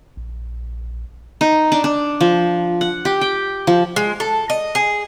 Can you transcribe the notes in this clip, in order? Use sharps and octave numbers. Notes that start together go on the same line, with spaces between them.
A#1
D#4
D4
D4
F3
F#5
G4
G5
F3
G#3
A4
D#5
G#4